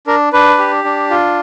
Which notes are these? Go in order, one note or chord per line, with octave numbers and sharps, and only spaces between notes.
D4 A#4
D4 B4
G4
D4
F4